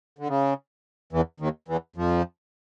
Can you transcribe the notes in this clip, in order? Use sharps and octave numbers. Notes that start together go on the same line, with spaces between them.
D3
C#3
E2 E3
D#2 D#3
E2 E3
F2 F3